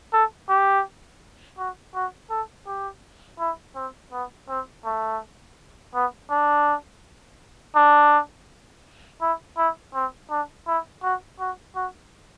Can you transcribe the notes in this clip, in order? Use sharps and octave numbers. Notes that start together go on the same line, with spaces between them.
A4
G4
F#4
F#4
A4
G4
E4
C4
B3
C4
A3
B3
D4
D4
E4
E4
C4
D4
E4
F#4
F#4
F#4